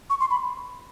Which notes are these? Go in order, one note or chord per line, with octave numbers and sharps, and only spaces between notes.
C#6
C6
B5